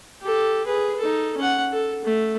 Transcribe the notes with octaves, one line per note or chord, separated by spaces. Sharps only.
G4 A4
G#4 B4
D#4 A4
C#4 F#5
A4
A3